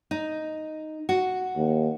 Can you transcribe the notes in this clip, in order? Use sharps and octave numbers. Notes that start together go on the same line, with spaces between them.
D#4
F#4
D#2